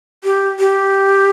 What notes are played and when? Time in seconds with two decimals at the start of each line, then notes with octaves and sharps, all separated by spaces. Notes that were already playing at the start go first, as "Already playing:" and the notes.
0.24 G4
0.59 G4